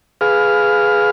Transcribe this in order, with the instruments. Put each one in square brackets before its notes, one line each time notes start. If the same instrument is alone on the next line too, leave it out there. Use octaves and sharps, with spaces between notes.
[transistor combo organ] G#4 B4 F5 F6